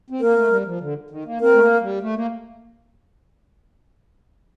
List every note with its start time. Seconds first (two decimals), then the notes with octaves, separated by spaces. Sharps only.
0.10 C4
0.21 A#3 A#4
0.35 A3
0.50 G3
0.65 F3
0.81 D3
1.10 D#3
1.25 A#3
1.40 C4 A#4
1.54 A3
1.61 A#3
1.81 G3
2.01 A3
2.16 A#3